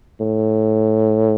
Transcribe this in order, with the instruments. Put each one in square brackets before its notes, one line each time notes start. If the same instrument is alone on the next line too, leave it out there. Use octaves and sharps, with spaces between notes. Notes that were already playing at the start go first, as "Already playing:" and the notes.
[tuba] A2